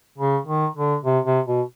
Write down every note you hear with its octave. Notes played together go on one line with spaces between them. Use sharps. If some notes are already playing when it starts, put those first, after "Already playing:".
C#3
D#3
D3
C3
C3
B2